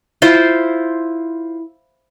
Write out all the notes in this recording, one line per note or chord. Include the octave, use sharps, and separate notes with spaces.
E4 F4 C5